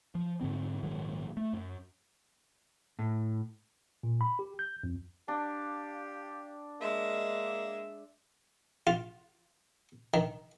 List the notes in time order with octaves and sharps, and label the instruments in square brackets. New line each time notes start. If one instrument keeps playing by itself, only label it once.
[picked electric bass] F3
G#2 D3 C4
A#1 G#2 D#3 F#3
A3
F#2
[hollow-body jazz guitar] A2
[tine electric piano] A#2
B5
G4
G6
F2
[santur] D4 [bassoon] G4 [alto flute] F5
[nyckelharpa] G#3 E5 [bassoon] A#3 [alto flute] D#5
[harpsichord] F4
D#3